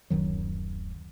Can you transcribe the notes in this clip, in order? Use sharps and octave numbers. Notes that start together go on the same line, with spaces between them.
D1 F#2 D#3 F#3